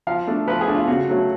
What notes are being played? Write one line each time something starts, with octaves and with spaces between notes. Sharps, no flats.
F3 F5
A3 D4
F3 B4
G#4
A3 D4
F4
C#3 F#4
F#3 A3 C#4